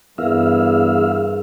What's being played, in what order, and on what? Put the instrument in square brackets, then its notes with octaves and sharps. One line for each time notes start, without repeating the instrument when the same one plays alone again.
[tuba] E2 [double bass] G2 [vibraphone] G#4 A#4 [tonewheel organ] E5 F5